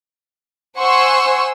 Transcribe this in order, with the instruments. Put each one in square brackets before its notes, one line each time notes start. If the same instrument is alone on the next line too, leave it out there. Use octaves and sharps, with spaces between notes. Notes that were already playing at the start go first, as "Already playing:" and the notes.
[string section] C5 F#5 G#5 C6 C#6 E6